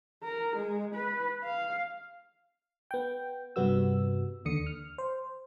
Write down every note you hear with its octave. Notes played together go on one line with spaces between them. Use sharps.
A#4
G#3
B4
F5
B3 G5
G2 C3 G3 B3 F#4 E6
D#2 D3 D#6 C#7
F6
C5